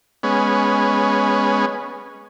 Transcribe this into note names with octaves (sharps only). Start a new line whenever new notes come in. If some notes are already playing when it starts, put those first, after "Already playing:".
G#3 B3 C#4